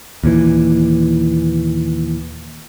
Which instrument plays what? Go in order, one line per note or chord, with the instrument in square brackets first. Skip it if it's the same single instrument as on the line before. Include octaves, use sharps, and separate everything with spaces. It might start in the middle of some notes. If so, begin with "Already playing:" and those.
[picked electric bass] D#2 A#2 E3